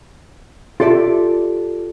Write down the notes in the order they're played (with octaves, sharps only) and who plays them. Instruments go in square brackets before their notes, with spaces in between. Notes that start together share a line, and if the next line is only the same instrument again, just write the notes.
[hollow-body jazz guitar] F4 G4 A4 D5 E5